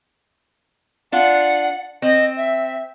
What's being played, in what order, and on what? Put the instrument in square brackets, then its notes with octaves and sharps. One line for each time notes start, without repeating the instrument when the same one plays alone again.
[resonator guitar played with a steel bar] D4 F4 [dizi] F#5
[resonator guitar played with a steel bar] C4 [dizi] D#5
[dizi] E5